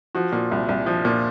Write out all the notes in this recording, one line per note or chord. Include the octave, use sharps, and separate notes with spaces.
F3 F#4
A#2
C2
C2
F3
A#2